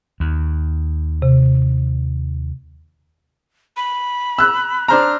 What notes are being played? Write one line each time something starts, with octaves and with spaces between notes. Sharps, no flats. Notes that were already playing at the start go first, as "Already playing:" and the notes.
D#2
C3
B5
E6 F#6
D4 C5 A#5 F6